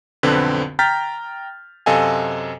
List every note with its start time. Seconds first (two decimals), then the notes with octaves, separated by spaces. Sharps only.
0.23 B1 F2 D3 C4 B4
0.79 G5 A#5 F6 G6 A6 B6
1.86 F#2 C3 A4 D#5 F5 G#5